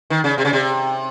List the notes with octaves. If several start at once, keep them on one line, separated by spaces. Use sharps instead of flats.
D#3
C#3
C3
C#3
C3